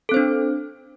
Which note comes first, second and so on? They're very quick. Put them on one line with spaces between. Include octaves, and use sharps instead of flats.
A4 C4 C5 D4